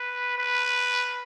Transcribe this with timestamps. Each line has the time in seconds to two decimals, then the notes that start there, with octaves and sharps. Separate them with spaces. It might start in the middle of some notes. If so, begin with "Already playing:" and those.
Already playing: B4
0.38 B4